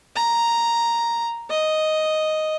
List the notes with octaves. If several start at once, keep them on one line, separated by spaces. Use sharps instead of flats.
A#5
D#5